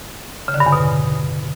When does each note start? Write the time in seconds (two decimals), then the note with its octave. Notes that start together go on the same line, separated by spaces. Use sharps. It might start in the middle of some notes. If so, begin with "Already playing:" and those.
0.48 C#3
0.54 D3
0.60 G2
0.66 E2
0.72 B2